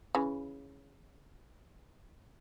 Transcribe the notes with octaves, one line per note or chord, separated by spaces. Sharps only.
C#3 E3